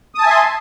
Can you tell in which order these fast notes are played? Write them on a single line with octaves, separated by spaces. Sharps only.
D#6 A5 G#5 E5 C6